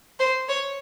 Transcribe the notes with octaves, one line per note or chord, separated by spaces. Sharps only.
C5
C#5